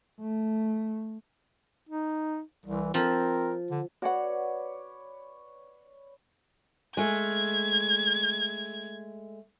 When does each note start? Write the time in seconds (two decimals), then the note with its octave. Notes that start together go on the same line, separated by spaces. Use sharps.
0.20 A3
1.89 D#4
2.66 C2 E3
2.94 F3 C4 A#4
3.71 D3
4.02 F#4 B4 C#5 D5 F#5
6.97 G#3 A3 G#6